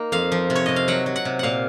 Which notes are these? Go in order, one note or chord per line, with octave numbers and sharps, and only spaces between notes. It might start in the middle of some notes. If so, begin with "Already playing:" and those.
Already playing: A#3 D#4
F2 F5
F3
C3
C#5
C3 D#5
F5
F#3 F#5
F#3
F#5
C3
A#2 F5 F#5